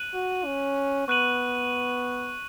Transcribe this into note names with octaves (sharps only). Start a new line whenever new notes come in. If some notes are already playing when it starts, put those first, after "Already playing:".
Already playing: F#6 D#7 F#7
F#4
C#4
B3 C#6 F#6 D#7 F#7